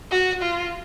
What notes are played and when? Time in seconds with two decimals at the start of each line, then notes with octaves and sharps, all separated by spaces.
0.11 F#4
0.42 F4